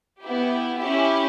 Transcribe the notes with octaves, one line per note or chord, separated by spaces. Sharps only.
B3 E4 G4
C#4 E4 G4 E5